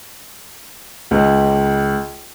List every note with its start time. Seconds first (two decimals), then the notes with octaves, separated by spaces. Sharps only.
1.11 C#2